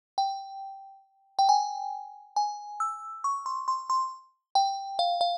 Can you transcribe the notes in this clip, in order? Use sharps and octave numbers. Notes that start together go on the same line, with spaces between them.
G5
G5
G#5
G#5
E6
C#6
C6
C6
C6
G5
F5
F5